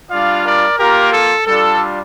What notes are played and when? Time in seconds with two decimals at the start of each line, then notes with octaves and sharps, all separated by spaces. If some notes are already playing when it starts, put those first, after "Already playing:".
0.11 G3 D4 F4 D5 F5
0.45 A#4 D5
0.78 A#3 F4 G4 A#4
1.13 A4
1.45 G3 D4 F4 A4